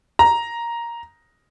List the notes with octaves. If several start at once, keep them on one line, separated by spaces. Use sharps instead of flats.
A#5